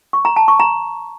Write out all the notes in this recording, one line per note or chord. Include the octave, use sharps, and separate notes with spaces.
C#6
A#5
A5
C#6
A#5